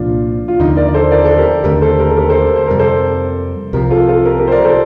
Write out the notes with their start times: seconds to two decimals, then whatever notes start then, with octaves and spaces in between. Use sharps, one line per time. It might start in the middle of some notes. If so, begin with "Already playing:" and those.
Already playing: C2 A#2 F3 A#3 D4 F4
0.48 F4
0.60 D#2 D3 F3 D#4
0.77 A#4 D5
0.87 D5
0.94 A4 C5
1.11 A#4 D5
1.25 A4 C5
1.38 G4 A#4
1.63 D#2 D3 A3 G4 A#4
1.81 A4 C5
1.99 G4 A#4
2.11 A4
2.17 G4 A#4
2.29 A4 C5
2.56 C5
2.67 F2 C3 G3 A#4
2.79 A4 C5
3.73 C2 C3 F3 G4 A#4
3.90 F4 A4
4.09 F4 A4
4.25 G4 A#4
4.39 G4 A#4
4.47 C5
4.51 A#4 D5
4.65 A4 C5